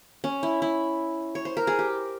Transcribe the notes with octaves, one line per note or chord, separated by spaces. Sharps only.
C#4
E4
E4
C#5
C5
A#4
G#4
G4